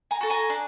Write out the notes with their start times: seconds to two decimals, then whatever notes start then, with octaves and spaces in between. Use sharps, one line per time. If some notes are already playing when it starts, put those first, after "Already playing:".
0.11 G#5 A#5
0.21 F#4 A4
0.30 G#5 A#5
0.50 D4